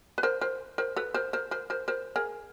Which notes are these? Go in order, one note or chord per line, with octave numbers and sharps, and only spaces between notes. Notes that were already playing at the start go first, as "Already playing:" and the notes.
B4
A#4 C5
A#4 C5
A#4 C5
A4 B4
A#4 C5
A#4 C5
A#4 C5
A#4 C5
A#4 C5
G#4 A#4